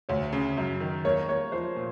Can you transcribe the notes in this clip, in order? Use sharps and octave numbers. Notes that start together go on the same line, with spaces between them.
D2 C#5
C#3
F#2
D#3
A#3 C#5
A#3 C#5
F3 C5
A#2